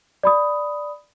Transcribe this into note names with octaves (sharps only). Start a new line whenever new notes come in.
D5 B5 D#6